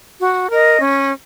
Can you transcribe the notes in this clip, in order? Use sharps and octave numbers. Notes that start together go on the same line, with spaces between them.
F#4
A#4 D#5
C#4